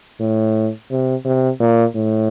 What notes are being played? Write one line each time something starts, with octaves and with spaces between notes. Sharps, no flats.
A2
C3
C3
A#2
A2